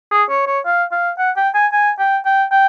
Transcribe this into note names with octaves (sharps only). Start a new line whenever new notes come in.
G#4
C#5
C#5
F5
F5
F#5
G5
G#5
G#5
G5
G5
G5